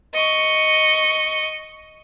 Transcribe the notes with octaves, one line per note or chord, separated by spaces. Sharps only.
D#5 C#6